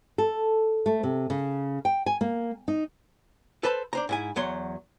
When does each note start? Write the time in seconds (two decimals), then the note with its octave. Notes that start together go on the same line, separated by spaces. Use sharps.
0.18 A4
0.86 A3
1.03 C3
1.30 C#3
1.85 G5
2.06 G#5
2.21 A#3
2.68 D#4
3.63 A4 B4 C5 A5 B5
3.93 D4 C5 A#5
4.09 G#2 E4 G#5
4.36 E2 F#3 C#5 C6